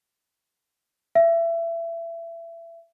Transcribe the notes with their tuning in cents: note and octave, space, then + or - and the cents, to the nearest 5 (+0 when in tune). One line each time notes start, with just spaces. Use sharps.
E5 +25